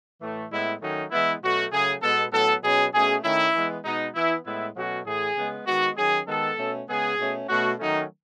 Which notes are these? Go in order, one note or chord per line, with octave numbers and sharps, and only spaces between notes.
A2 E3 A3
A2 G#3 B3 E4
D#3 F#3 A3 C#4 D#4
E3 G#3 B3 E4
B2 F#3 A3 F#4
C#3 F#3 A3 G#4
B2 G#3 B3 A4
A2 F#3 B3 A4
B2 F#3 C#4 G#4
B2 A3 C#4 G#4
D#3 A3 C#4 E4
E3 G#3 B3
B2 G#3 B3 D#4
E3 B3 E4
A2 G#3 B3 E4
B2 F#3 A3 C#4 F#4
A2 E3 A3 G#4
C#3 G#3 B3
D#3 G#3 B3 F#4
D#3 F#3 C#4 G#4
D#3 G#3 B3 A4
B2 A3 C#4
C#3 G#3 B3 G#4
B2 A3 C#4
B2 A3 C#4 F#4
D#3 F#3 A3 C#4 D#4